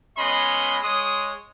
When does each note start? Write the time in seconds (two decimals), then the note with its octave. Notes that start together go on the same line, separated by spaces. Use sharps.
0.17 G#3 B3 C#4 D#5 B5 C6
0.83 G#3 C#5 C6 D#6